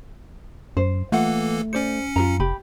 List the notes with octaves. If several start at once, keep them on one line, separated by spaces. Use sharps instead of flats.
F#2 C5
E3 A3 A#3 F4 A4 F#5
C#4 C5 D5 C#7
F#2 F4 A#4 A#5
F1 G4 B5